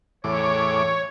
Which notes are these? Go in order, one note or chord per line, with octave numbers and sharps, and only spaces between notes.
E2 A2 C#5 D6